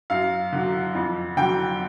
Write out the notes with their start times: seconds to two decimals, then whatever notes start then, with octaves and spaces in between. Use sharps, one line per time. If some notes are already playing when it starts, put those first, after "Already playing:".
0.10 F#2 F5
0.53 D3 F#3
0.95 F2
1.37 D3 F#3 G5